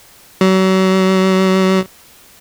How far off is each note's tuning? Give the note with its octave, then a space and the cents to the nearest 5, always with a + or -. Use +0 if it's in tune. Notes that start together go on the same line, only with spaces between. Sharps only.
F#3 +35